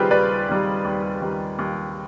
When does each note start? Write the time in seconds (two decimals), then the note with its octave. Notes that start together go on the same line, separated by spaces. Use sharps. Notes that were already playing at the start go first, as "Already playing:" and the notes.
Already playing: D#3 G3 C4 F4 G4 G#4 B4
0.11 D#2 B4 D5
0.49 D#3 G3
0.85 D#2
1.22 D#3 G3
1.59 D#2